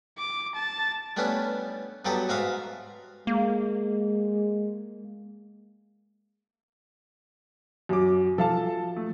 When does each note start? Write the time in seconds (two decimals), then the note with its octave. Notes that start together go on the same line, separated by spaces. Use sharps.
0.18 D6
0.55 A5
1.17 G3 A3 B3 C#4 D4
2.05 G2 F#3 B3 G4 A4 D#6
2.29 G#2 F#4 E5 F5 D#6
3.27 G#3 A#3
7.89 F#2 F#3 D6
8.38 F3 A4 F5 A5
8.96 A3